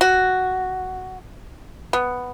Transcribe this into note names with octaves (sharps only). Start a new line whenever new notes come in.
F#4
B3